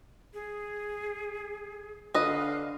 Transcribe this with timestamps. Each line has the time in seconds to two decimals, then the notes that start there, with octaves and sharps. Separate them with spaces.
0.34 G#4
2.14 D3 B4 D#5 F5